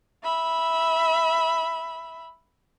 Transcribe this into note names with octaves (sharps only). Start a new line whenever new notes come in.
E5 B5